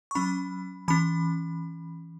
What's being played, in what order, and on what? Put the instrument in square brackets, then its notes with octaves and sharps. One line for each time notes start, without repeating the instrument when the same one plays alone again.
[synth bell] C#6
F#3 C#4 B5
E3 C#4 B5